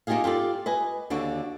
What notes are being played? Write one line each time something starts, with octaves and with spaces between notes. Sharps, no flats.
A#3 D#4 F4 G4 G#4 F5
F4 G4 A4 D5
B4 D#5 G#5
D#2 D3 D4 F#4